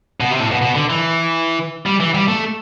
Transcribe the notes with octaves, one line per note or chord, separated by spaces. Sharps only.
B2
C3
A2
B2
B2
D3
E3
G3
E3
G3
A3